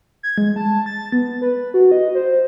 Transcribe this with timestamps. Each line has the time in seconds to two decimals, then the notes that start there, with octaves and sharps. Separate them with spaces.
0.23 G#6
0.38 G#3
0.56 A5
0.86 A6
1.12 B3
1.41 B4
1.55 B4
1.74 F#4
1.92 D#5
2.15 C5